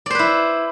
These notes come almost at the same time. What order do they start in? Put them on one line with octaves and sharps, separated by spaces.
D5 C5 B4 E4